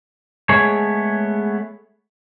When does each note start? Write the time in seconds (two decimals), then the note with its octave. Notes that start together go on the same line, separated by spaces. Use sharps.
0.49 G#3 A3 B3 G#4 C#5